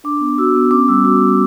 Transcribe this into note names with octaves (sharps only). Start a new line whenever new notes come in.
D4 D6
B3
F#4 E6
B3
C#4 D6
G3 E6
F#4 D6
G3